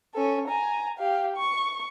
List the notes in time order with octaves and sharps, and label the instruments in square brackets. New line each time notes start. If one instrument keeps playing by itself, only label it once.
[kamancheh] C#4 A4
G#5 A#5
G4 F5
C#6